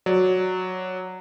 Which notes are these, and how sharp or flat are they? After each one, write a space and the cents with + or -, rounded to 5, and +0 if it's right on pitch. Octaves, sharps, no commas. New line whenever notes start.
F#3 -5 D5 +0